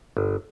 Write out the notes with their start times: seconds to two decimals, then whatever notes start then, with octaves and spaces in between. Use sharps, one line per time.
0.17 G1